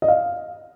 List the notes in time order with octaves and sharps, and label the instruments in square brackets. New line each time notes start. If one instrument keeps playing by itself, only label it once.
[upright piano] D#5
F5